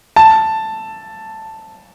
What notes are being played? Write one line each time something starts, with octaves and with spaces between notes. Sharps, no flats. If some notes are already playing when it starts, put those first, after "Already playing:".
A5